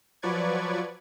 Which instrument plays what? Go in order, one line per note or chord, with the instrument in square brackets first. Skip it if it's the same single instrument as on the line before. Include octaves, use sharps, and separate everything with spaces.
[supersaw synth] F3 F#3 B4 D5 C#6 G#6